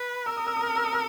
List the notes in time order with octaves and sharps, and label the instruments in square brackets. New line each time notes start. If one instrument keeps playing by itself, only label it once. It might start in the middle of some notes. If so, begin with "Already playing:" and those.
Already playing: [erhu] B4
[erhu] A#4 [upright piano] E6
[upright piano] D#6
E6
D#6
F6
E6
D#6
E6